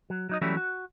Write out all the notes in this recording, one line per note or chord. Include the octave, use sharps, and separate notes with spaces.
F#3
F#3 D#4 D#5
E3 F#3 G3 A3 C#4 E4
F#4